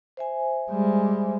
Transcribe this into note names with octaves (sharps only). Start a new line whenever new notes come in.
C5 E5 G#5
G3 G#3